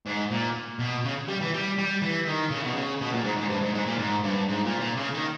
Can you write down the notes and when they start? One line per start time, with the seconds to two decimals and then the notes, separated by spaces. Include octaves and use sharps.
0.06 G#2
0.31 A#2
0.79 B2
1.04 C#3
1.28 G3
1.41 E3
1.53 G3
1.78 G3
2.02 E3
2.27 D#3
2.51 C#3
2.64 B2
2.75 C#3
3.01 B2
3.13 A#2
3.25 G#2
3.38 G#2
3.49 G2
3.62 G#2
3.74 G#2
3.87 A#2
3.98 G#2
4.23 G2
4.49 G#2
4.65 A#2
4.80 A#2
4.97 C#3
5.14 D#3